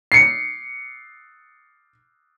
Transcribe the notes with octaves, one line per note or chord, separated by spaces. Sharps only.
C7 C#7